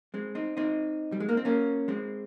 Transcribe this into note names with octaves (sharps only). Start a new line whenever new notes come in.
G#3 C4
C4 D#4
C4 D#4
G3
G#3
A#3
C4
A#3 C#4
G#3 C4